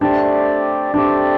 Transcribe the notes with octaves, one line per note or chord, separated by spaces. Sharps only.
A3 C4 D4 G4 D5
A3 C4 D4 G4 D5